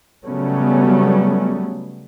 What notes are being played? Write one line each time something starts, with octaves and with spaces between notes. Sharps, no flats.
C#3 F#3 G3 A3 B3 C#4